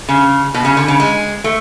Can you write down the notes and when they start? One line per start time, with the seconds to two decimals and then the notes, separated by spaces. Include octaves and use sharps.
0.09 C#3
0.54 B2
0.65 C#3
0.77 D3
0.88 C#3
1.00 G#3
1.44 A3